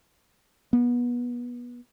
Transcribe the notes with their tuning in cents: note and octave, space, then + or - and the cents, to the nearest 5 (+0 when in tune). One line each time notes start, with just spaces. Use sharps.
B3 -25